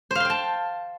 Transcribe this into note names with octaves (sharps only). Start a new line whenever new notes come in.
C5 F5 G5 A5 C6